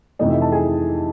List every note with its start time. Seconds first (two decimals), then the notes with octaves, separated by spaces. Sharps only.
0.19 F2 C3 E3 A3 D#4 D#5
0.30 E4 E5
0.41 A4 A5
0.52 G#4 G#5